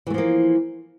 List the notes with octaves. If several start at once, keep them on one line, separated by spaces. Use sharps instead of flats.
E3 F3 A3 A#3